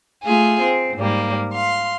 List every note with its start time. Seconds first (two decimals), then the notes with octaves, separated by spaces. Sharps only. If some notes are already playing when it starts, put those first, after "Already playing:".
0.24 A3 F4 G#4
0.62 C4
0.97 G#2 G3 A#3
1.54 F5 C6